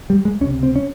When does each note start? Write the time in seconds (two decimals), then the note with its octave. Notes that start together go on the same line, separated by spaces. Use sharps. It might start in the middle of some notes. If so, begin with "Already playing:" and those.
0.10 G3
0.25 G#3
0.41 C#2 C3 C#4
0.63 C4
0.76 C#4